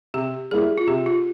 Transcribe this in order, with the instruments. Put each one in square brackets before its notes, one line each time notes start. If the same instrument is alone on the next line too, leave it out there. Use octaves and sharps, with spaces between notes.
[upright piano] C3 [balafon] G4
[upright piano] G3 A#3 E4 [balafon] G#4
[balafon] F4
[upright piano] C3 [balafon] G4
[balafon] F4